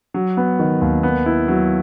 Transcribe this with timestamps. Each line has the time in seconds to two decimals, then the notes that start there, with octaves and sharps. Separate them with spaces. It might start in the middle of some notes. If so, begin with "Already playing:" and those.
0.14 F#3
0.37 B3
0.59 D#3
0.81 D#2
1.03 B3
1.26 E4
1.48 F#3